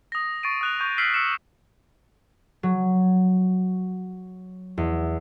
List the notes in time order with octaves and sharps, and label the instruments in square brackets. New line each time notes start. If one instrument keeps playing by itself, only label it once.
[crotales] D#6 A#6
C#6 A6 C7 D7 D#7
D#6 F#6 F7
C#6 G6
E6 F6 B6 C7 D7 F#7
E6 C#7 E7
[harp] F#3
E2